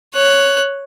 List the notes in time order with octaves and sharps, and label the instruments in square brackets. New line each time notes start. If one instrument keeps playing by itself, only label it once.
[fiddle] C#5 F#6